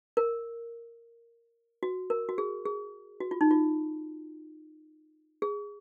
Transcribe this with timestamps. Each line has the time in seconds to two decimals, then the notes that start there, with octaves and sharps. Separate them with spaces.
0.17 A#4
1.83 F#4
2.10 A#4
2.29 F#4
2.38 G#4
2.66 G#4
3.20 F#4
3.31 F4
3.41 D#4
3.51 F4
5.42 G#4